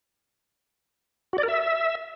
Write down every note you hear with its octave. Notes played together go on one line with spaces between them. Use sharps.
F#4
D5
A#4
E5